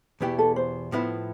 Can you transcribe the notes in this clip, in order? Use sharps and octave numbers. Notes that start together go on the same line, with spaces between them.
E2 B2 B3 E4 G4
A4
C5
A2 F3 B3 E4